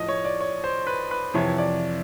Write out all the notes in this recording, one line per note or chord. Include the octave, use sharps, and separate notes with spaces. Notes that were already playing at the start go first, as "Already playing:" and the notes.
Already playing: A2 F3 D#5
C#5
D5
C#5
C5
B4
B4
F2 C3 E3 C#5
D5